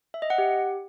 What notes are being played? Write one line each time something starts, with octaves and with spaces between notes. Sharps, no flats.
E5
D#5
F#5
G4